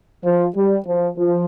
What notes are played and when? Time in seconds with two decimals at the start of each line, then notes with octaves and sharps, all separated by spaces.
0.24 F3
0.56 G3
0.86 F3
1.17 F3